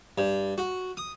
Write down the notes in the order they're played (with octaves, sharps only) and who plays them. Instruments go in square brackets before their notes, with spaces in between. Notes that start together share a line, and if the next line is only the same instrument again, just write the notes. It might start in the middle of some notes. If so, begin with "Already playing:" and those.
[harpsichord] G2
F#4
D#6